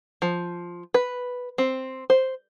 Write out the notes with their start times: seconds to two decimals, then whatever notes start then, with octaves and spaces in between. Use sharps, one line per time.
0.22 F3
0.94 B4
1.58 C4
2.10 C5